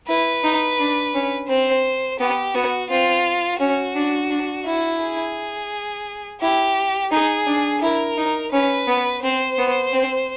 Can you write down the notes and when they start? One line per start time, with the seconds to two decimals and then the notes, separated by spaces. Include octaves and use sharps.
0.08 E4 B4
0.44 D#4
0.79 D4
1.14 C#4
1.49 C4 C5
2.20 B3 G4
2.55 B3 F#4
2.90 C4 F4
3.60 C#4 F#4
3.95 D4
4.30 D4
4.66 E4
5.01 G#4
6.41 E4 G4
7.11 D#4 G#4
7.47 D4
7.82 E4 A#4
8.17 D#4
8.52 C#4 B4
8.88 B3
9.23 C4 C5
9.58 B3
9.93 C4